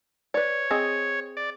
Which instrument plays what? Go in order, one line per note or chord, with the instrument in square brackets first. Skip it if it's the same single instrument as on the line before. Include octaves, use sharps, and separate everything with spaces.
[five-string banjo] B4 D5 [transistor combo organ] C#5
[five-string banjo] C4 G#4 D#5
[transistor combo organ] D5